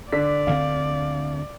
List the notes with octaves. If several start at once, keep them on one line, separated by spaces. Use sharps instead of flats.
D3 D4 D5 B6
D2 D3 C4 F5